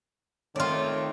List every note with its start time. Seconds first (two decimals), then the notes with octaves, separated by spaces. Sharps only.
0.56 D#3 A3 C4 F4 C#5 D5